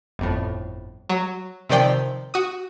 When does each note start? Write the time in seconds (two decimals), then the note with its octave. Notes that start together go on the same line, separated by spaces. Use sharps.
0.19 G1 F2 A2
1.09 F#3
1.69 C3 D#3 F3 D5 G5
2.34 F#4 D#6